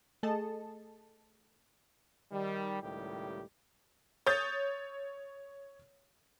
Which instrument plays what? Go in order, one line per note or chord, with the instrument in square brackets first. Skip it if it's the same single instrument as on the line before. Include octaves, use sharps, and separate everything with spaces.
[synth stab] A3 G#4 A4 D#5 A5
[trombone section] D#3 G3
C#2 A2 D#3 G3 G4
[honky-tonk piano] C#5 D#6 G6 A6